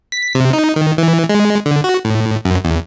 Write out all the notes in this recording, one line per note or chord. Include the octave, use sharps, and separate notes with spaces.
B6
C3
D#4
D#3
E3
G#3
D3
F#4
A2
F#2
E2